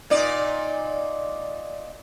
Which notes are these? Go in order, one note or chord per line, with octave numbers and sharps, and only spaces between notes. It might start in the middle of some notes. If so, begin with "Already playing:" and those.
A#2 D#4 D5